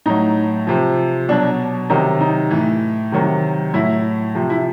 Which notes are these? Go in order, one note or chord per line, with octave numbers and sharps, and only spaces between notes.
A2 F#3 D#4
C3 F3
B2 F#3 D4
C3 D#3 F#3 D#4
D#4
A2 E3
C3 D#3 F#3
A2 F#3 E4
C3 F3
E4